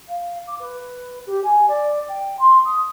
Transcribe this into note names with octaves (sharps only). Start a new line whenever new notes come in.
F5
D6
B4
G4
G#5
D5
G5
C6
D#6